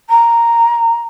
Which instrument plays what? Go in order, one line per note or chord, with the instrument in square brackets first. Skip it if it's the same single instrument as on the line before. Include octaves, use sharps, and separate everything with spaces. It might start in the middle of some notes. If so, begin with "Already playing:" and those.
[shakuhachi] A#5